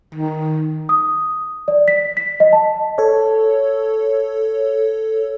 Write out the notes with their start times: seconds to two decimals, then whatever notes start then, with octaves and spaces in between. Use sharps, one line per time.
0.14 D#3
0.89 D#6
1.68 D5
1.88 B6
2.17 B6
2.40 D#5
2.53 A5
2.98 A4 C#5